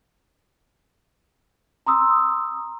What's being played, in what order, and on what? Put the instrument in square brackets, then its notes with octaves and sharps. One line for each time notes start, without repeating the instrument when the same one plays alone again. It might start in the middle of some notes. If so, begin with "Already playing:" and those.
[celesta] A#5 C6 D#6 E6